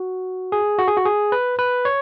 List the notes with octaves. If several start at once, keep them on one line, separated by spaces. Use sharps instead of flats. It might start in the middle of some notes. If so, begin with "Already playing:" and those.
Already playing: F#4
G#4
F#4
G#4
F#4
G#4
B4
B4
C#5